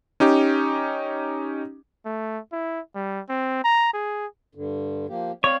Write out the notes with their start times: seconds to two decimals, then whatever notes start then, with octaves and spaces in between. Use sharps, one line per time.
0.20 C#4 D#4 G4
2.05 A3
2.52 E4
2.95 G3
3.29 C4
3.64 A#5
3.93 G#4
4.55 G2 D3
5.09 F3 A#3 G4
5.44 C4 C#5 D5 F5